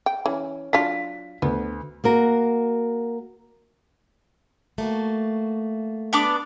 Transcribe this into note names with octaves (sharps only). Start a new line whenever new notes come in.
G5
E3 C#4
F#3 D4 F4 B6
D2 B3
A#3 F#4 A#4
A3 A#3 F#4
B3 D4 D6